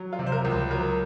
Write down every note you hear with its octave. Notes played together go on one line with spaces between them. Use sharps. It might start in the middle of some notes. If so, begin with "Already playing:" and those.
Already playing: F#3
F4
C3
C5
A#4
C#2
C5
F#3 A#4